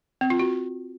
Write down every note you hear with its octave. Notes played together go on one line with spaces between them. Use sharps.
C4
F4
F#4